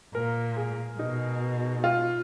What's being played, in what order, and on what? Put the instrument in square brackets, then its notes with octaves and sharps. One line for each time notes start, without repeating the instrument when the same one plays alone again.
[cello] A#2 [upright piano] A#4
[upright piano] G#4
[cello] B2 [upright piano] D#4
[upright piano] F4